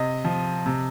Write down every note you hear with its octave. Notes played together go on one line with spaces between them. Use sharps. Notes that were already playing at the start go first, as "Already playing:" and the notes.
Already playing: C3 D#5
F3
C3